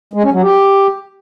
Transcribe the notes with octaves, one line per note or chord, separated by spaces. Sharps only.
G#3
C#4
F#3
G4